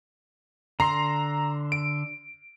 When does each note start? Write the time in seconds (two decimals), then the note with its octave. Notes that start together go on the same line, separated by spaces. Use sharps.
0.80 D3 A#5 C6 C7
1.72 D7